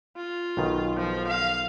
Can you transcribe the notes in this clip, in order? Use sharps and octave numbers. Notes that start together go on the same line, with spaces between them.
F4
B1 B2 D#3
F3
F5